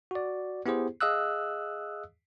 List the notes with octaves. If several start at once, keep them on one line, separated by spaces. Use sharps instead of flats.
F#4 D5
B3 E4 G4 G#4 C5
G#4 D#5 F5 D#6 E6 F#6